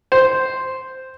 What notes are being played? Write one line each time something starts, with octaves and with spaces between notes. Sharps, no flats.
C5